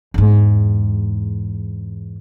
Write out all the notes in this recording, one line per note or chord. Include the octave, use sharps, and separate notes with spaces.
E2 G#2